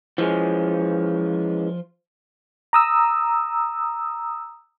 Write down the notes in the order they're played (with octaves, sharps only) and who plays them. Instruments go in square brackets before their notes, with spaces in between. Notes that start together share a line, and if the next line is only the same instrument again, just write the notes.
[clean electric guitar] E3 G#3 C#4 [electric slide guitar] F3
[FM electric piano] A#5 D#6 E6